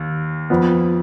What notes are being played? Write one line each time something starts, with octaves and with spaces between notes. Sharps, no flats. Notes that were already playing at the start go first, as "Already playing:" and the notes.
Already playing: D#2
F2 F3 B3